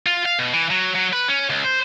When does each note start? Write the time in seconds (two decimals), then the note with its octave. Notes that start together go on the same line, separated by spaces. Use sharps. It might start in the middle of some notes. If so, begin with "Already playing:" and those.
0.06 F4
0.26 F5
0.39 B2
0.53 E3
0.70 F#3
0.95 F#3
1.13 B4
1.28 C#4
1.50 C#2
1.64 C5